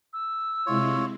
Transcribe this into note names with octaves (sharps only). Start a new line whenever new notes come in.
E6
C3 G#3 E4 F4 C#5